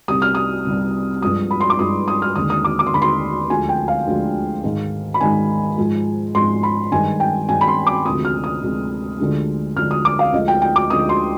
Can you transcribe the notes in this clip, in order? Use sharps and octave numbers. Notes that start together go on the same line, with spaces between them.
C2 C3 G3 D#6
F6
D#6
C2 C3 G3
G2 F3 G#3 D#6
B5
C6
D6
G2 F3 G#3 D#6
D#6
F6
D#2 D3 G#3 D#6
D#6
D6
D6
C6
D#2 D3 G#3 B5
C6
D2 D3 F3 G#3 G#5
G5
F5
D2 D3 F3 G#3
G#2 D#3 G#3
B5
G#2 D#3 G#3 G#5
G#2 F3 G#3
G#2 F3 G#3 C6
B5
G2 D#3 G#3 G#5
G5
G2 D#3 G#3 G#5
B5
C6
D6
D2 C3 F3 G#3 D#6
F6
D#6
D2 C3 F3 G#3
D2 D3 F3 G#3
D2 D3 F3 G#3 F6
D#6
D6
F5
D2 D3 F3 G#3 D#5
G5
G5
D6
D2 D3 F3 G#3 D#6
C6